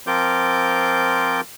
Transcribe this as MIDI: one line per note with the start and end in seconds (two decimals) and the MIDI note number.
0.07 1.41 53
0.07 1.41 60
0.07 1.41 65
0.07 1.41 70
0.07 1.41 86
0.07 1.41 91